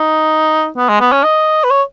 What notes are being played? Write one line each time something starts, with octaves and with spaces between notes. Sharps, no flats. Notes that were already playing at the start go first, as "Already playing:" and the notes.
Already playing: D#4
B3
G#3
B3
C#4
D#5
B4
C#5